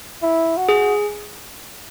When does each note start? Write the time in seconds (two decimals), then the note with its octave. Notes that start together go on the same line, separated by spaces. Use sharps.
0.22 E4
0.57 F#4
0.69 G#4